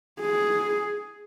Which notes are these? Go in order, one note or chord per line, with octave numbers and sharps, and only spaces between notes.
G#4